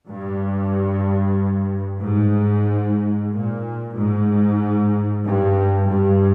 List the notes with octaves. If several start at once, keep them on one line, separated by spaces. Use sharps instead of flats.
G2
G#2
A#2
G#2
G2
G2